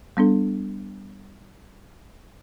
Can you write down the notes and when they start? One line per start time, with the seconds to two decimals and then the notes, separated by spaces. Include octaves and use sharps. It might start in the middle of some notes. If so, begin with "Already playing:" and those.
0.17 G3 B3 D4 A4